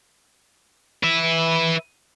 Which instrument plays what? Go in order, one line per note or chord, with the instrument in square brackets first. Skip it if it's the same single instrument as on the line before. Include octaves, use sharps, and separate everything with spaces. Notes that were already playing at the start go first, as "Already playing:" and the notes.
[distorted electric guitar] B4 E5